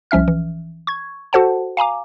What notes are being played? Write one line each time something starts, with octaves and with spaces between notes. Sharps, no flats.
C2 F3 C#4 E5 F6
E3
C#6 G#6
F#4 A4 C5 F#5 A5
F5 G#5 A#5 D6